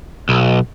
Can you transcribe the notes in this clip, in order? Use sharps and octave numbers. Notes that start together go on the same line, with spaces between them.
B1